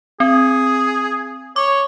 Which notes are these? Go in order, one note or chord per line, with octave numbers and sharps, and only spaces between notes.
C4 G#4
C#5 D6